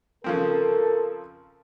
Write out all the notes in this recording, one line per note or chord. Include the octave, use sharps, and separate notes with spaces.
C#3 F3 C4 A4 A#4